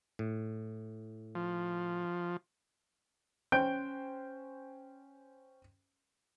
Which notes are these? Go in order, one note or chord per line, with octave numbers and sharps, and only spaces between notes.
A2
F3
C#4 C5 G5 G6 D7